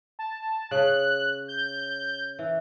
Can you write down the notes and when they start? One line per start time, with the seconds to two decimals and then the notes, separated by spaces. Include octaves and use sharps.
0.19 A5
0.71 C#3 F#6
1.48 G6
2.39 E3